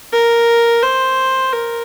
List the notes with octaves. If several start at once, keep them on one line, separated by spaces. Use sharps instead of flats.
A#4
C5
A#4